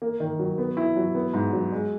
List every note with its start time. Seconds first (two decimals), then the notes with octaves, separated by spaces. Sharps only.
0.02 A#3
0.20 D#3
0.39 F#3
0.58 B3
0.77 E4
0.96 F#3
1.15 B3
1.34 G#2
1.53 F#3
1.72 G#3